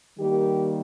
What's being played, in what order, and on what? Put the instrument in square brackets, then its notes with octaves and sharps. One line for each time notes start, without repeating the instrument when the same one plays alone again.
[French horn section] D#3 G3 A#3 G4